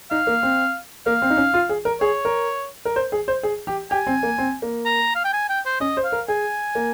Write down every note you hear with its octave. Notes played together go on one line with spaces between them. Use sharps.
D#4 F5
A#3
C4
A#3 F5
C4
D#4
C#4
F4
G#4
A#4
G#4 C#5
A#4
A#4
C5
G#4
C5
G#4
G4
G4 G#5
C4
A#3
C4
A#3
A#5
F5
G5
G#5
G5
C5
C#4 D#5
C5
F5
A#4
G#4 G#5
A#3